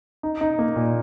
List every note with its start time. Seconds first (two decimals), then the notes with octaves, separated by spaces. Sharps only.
0.23 D#4
0.41 D#4
0.59 A#3
0.76 A#2